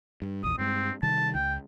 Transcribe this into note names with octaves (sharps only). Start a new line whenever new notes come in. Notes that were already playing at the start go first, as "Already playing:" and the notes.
G2
A#1 E2 D#6
G2 G#3 C4
C3 D#3 G3 A5
C#2 G5